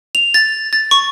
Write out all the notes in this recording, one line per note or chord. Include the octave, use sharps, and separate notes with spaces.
F7
A6
A6
C#6